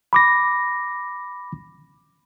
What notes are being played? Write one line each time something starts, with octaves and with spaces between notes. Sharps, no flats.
B5 D6 A#6